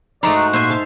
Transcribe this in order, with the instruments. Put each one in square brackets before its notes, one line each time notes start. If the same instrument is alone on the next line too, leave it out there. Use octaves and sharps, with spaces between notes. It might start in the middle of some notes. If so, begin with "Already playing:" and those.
[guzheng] G#2 G#3 A3 [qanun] D#4 [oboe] D5 [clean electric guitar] A#5
[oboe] F#4
[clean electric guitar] A#2 [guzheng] C5 E5 G#5
[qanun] F5 A5 C6